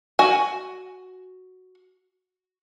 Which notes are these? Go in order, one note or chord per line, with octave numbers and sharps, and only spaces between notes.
F#4 G#5